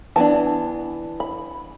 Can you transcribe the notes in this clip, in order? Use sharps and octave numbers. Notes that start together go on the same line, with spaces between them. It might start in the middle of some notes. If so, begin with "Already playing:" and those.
E3 B3 D4 A5
B5